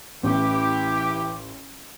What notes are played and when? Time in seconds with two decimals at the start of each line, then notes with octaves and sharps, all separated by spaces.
0.23 A1 E3 G4